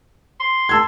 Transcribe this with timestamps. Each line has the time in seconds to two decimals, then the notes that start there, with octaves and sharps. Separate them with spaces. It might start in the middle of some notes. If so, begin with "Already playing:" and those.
0.40 C6
0.69 A5 E6 G#6